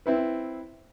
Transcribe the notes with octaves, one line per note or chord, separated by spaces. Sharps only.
C4 E4 B4